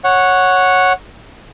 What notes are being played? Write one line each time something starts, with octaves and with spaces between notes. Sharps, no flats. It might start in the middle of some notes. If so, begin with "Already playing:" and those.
C#5 F#5